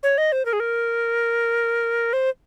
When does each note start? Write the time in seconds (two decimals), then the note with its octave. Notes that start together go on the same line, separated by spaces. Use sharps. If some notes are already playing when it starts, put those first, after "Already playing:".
0.03 C#5
0.18 D#5
0.32 C5
0.45 A#4
0.53 G#4
0.60 A#4
2.13 C5